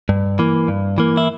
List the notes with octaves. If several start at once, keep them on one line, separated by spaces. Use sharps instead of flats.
G2
E3 A#3
G2
E3 A#3
E4